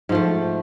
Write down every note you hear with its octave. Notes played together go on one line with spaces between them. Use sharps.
G#2 F3 A3